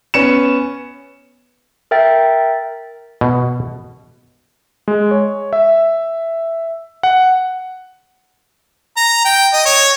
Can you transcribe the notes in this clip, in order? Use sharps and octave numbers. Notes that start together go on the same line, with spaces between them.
B3 C#4 C#7 E7
A#4 E5 G5 A6
B2
G#3
C#5
E5
F#5
A#5
G5
D#5
C#5